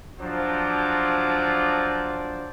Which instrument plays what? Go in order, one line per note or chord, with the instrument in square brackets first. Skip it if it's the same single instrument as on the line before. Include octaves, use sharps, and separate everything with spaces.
[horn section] F3 F#3 D4 C5 D5